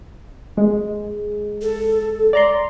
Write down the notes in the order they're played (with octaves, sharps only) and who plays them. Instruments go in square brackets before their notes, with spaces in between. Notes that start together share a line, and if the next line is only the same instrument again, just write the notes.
[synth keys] G#3
[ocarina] A4
[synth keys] D5 A#5 C6